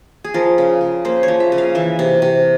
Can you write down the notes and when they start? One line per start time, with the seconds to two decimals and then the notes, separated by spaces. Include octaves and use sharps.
0.24 G#4
0.34 F3 A#4
0.58 C#3
0.81 C#3
1.05 A#3 C5
1.23 C#5
1.28 F3
1.40 E5
1.52 C#3
1.58 F5
1.75 E3 E5
1.99 C3
2.22 C3